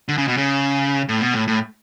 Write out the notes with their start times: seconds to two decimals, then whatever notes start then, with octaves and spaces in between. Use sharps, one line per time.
0.08 D3
0.18 C#3
0.28 B2
0.37 C#3
1.09 A2
1.21 B2
1.34 A2
1.48 A2